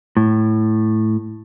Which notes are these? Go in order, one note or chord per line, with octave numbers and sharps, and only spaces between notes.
A2